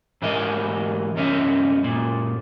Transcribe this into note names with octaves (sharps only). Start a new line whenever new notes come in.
G#2 E3 A#4 D#5 E5 G#5
C2 F#2 C#4 D#4 E5
F#2 A#2